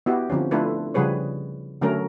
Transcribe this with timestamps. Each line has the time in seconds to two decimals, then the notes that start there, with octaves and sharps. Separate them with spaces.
0.06 B3 E4 F#4 G4
0.30 D3 F3 C4 C#4
0.51 A3 D4 E4 F4 A4 B4
0.94 C#3 F3 G3 G#4 B4 C#5
1.81 D3 F#3 A3 C#4 A#4